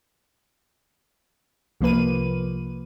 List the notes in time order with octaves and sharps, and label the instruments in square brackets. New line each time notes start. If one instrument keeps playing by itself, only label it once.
[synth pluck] C2 F3 A#3 B4 D#7